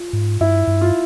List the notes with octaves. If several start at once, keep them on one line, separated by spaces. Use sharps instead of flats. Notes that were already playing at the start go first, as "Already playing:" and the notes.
Already playing: F4
G#2
G2 E4
G2
F4